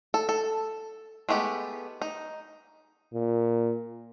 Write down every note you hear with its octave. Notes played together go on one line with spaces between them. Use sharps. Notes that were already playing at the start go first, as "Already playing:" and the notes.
A4
A4
G#3 A3 B3 G4
D#4
A#2